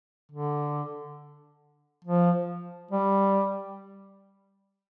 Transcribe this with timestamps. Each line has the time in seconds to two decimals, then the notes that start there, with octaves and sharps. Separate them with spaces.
0.32 D3
2.05 F3
2.91 G3